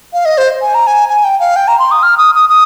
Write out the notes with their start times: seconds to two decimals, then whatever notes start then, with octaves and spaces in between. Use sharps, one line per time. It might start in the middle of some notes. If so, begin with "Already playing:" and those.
0.13 F5
0.25 D#5
0.38 C5
0.62 G#5
0.75 A#5
0.87 G#5
1.09 G#5
1.24 G5
1.40 F5
1.56 G5
1.68 A#5
1.79 C6
1.91 D#6
2.03 F6
2.18 D#6
2.35 D#6
2.49 D#6